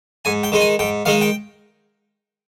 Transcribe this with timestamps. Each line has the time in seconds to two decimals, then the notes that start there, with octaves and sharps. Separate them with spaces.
0.25 G#2 G#5
0.43 G5
0.52 D#3 G#3 D#4
0.61 G#5
0.79 G#2 G5
1.05 D#3 G#3 D#4 F5
1.21 G5